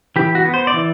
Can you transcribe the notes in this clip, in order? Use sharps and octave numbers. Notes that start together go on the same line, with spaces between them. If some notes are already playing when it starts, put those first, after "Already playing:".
E3 G4
F#4
B3
C5
D5
E3